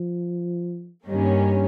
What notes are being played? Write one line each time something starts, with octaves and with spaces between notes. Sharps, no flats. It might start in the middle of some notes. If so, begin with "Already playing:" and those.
Already playing: F3
G2 D#3 G3 A#3 C#4